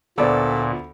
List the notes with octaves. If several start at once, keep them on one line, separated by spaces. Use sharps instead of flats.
D2 A#2 B3 A4 C5 D5 B5 D6